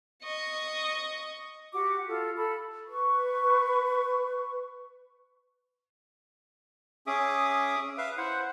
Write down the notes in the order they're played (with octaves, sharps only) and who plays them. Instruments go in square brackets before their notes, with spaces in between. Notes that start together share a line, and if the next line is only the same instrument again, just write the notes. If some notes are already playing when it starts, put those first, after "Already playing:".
[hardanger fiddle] D#5 C#6
[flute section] F#4 G4 F#5 D6
F4 A4
A4 B5
B4 C#6
[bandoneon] C#4 G#4 [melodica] E5 D6 D#6
[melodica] B4 [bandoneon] E5 F5
[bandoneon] E4 [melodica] C5 F#5